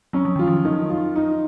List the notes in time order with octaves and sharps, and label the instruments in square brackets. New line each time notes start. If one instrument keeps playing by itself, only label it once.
[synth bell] F#3 [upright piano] C#4
[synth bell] F3
[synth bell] D#3 [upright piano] F4
[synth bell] F3
[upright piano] D#3
F4
D#4